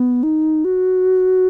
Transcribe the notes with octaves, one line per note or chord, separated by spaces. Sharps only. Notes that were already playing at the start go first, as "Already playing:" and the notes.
Already playing: B3
D#4
F#4